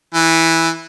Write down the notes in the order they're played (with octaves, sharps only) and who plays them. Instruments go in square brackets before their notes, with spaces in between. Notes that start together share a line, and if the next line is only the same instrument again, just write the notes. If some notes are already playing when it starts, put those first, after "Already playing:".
[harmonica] E3